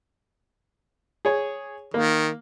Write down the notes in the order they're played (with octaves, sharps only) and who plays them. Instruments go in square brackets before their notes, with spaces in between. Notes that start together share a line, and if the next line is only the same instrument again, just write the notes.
[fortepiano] G#4 C#5
[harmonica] D#3 [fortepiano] A#3